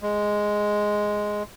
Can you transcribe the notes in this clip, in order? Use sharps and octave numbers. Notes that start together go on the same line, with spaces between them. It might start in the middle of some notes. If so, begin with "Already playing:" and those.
G#3